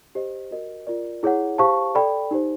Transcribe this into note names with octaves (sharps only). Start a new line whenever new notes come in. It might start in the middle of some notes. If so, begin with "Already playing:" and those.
G4 C5 D#5
F#4 A#4 D#5
F4 A#4 D5
E4 G#4 C#5 F#5
G4 C5 F5 A5 C#6
A4 D5 G5 B5
D#4 G4 C5